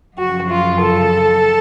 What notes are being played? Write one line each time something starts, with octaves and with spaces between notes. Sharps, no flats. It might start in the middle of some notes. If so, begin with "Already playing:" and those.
F#2 C#3 F3 F#4
F4
A4